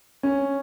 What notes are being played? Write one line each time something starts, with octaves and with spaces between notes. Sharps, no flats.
C#4